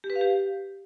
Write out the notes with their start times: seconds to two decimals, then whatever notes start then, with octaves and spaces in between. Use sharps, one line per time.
0.04 G4
0.10 B4
0.16 F5
0.21 G4